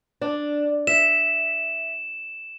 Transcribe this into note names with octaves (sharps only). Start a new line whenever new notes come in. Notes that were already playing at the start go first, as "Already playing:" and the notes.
D4
E5 E7